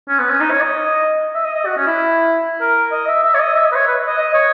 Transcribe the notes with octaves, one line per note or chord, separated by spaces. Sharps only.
C#4
B3
C#4
D#4
C#5
D#5
E5
D#5
D#5
F#4
C#4
E4
A#4
D#5
E5
E5
C#5
D#5
E5
D#5
B4
C#5
B4
D#5
D#5
C#5